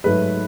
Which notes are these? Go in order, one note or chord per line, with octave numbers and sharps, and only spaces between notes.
G#2 F#3 A3 B4